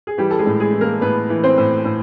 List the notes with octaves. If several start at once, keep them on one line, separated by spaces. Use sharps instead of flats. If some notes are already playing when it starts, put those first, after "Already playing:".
G#4
E3 G3 G4
A4
G#3 G#4
A2
G#3 G#4
E3
A#3 A#4
A2 B3 B4
E3
C4 C5
A2
A2